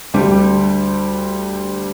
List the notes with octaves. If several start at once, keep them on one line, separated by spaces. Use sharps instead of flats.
D2 G3 G4